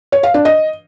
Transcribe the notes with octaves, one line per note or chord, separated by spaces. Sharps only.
C#5
F5
D4
D#5